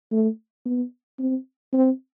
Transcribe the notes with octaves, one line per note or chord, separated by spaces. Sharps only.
A3
B3
C4
C4